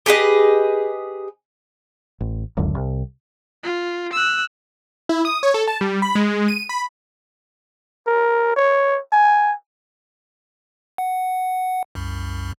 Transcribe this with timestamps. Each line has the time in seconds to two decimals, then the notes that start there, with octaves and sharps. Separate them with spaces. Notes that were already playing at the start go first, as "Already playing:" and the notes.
0.06 G4 G#4 B4 D#5
2.21 A1
2.57 D1 C#2 F#2 D3
2.75 C2
3.63 F4
4.13 E6 F#6
5.09 E4
5.25 D#6
5.43 C#5
5.54 A4
5.68 A5
5.81 G3
6.02 B5
6.15 G#3
6.48 D#7
6.69 B5
8.07 A#4
8.56 C#5
9.13 G#5
10.98 F#5
11.95 C2 F#2